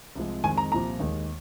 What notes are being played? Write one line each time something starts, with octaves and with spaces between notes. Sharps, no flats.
C2 C3 F3 G#3
F2 D#3 G#3 G#5
A#5
C2 A#2 F3 A#5
D#2 D#3 G#3